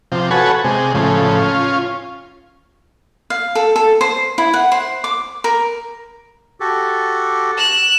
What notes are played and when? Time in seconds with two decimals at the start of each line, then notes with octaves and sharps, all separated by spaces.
0.12 C3 F3
0.31 F#4 A4 B4 C#5 G#5
0.64 C3 G#3
0.95 A2 C#3 F3
1.40 C#4 F4
3.30 F5
3.55 A4
3.76 A4
4.01 C5
4.38 E4
4.54 F#5
4.72 C5
5.04 D6
5.44 A#4
6.60 F#4 G4 A4
7.57 F#6 E7